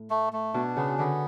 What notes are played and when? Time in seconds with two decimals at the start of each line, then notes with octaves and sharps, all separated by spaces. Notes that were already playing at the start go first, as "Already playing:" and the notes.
Already playing: A2
0.10 A3
0.33 A3
0.54 B2 D4
0.77 C#3 B3
0.99 D3 B3